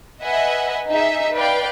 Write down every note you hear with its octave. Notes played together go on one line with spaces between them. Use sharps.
B4 D#5 E5 F#5 G#5
D#4 G#4 E5
B4 D5 F5 G5